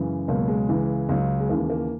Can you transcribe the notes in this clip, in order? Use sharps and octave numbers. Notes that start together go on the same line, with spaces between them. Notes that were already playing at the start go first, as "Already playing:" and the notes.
Already playing: F#2 C#3 E3 G#3
C#2 B2 F#3 A#3
G#3
C#2 C#3 E3
C#2 C#3 F#3
G#3
D#2 C#3 E3 A#3
A#3